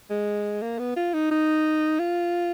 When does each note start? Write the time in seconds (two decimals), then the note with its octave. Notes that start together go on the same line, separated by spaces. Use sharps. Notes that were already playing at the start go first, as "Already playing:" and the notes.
0.10 G#3
0.62 A#3
0.79 B3
0.96 F4
1.14 D#4
1.31 D#4
1.99 F4